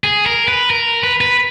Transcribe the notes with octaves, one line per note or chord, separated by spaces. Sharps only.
G#4
A#4
B4
A#4
B4
B4